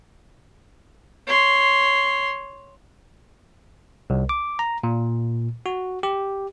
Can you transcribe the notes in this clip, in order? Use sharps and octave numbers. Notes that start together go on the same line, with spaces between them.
C#5 C6
C2
D6
A#5
A#2
F#4
G4